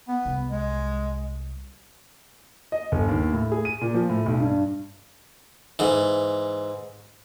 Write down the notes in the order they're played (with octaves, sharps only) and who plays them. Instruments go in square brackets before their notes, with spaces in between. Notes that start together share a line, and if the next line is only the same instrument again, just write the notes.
[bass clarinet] B3
[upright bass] C2
[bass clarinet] G#3
[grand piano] D#5
G1
D#2
A2
G#4
D#7
A#2
F3
A2
B1
G2
[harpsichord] G#2 E3